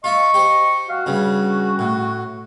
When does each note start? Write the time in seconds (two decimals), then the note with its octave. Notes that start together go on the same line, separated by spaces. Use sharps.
0.04 F4 D#5 E5 C#6
0.34 G4 C5
0.89 F#4 F5
1.06 G2 C#3 C#4
1.79 A2